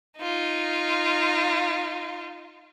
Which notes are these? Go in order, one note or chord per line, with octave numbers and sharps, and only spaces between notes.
D#4 F4